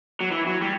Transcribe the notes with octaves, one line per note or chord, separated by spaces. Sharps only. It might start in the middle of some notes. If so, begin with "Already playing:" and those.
F#3
E3
F#3
G3